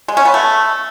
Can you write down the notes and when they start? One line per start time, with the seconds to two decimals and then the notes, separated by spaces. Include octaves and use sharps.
0.08 G#3
0.17 C#4
0.25 B3
0.34 A3